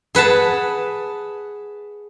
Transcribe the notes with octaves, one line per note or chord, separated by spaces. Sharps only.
G#4 B4 F#5 A5